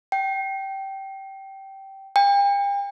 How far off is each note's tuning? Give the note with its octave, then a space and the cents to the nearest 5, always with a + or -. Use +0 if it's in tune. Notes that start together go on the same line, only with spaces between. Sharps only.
G5 -15
G5 +40